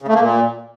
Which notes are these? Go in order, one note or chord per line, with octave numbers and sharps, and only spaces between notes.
C#3
A3
A#3
A#2